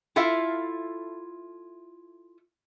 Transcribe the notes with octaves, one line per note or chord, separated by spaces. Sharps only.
E4 F4 A4 E5 F5